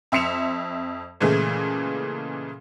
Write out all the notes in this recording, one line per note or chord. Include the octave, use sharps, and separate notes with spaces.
F2 E5 C6 C#7 E7 F7
A#2 C#3 E3 G#3 A3